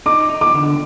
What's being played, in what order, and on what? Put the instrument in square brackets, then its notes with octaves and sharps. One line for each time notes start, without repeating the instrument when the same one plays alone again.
[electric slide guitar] D#4 [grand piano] D6
[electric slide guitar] D#4
[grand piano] D6
[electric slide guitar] D3